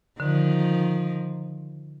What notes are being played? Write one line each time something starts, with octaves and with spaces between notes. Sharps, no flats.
D3 D#3 F3